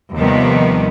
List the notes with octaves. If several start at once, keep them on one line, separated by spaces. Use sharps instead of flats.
D#2 C3 D#3 F3 G3 B3